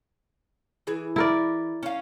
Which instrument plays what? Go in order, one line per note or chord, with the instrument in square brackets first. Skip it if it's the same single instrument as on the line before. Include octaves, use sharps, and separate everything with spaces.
[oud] E3 G#4
[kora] E4 A#4 D5
[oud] C#4 F5